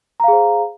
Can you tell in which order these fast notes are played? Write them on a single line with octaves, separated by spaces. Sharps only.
A#5 F5 G#4 C5